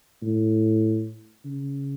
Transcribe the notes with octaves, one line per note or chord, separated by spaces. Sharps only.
A2
C#3